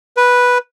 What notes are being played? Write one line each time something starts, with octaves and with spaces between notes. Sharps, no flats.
B4